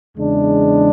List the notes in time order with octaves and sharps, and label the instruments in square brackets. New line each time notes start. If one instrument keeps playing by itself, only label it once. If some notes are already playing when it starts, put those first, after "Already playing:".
[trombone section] E2 C#3 G#3 D4